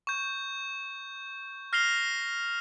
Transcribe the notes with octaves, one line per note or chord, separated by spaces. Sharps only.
C#6 G6
F6 A#6 C7 F7 G7